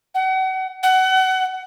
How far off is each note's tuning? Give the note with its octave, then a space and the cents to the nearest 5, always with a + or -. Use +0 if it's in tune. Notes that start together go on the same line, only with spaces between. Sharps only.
F#5 +35
F#5 +25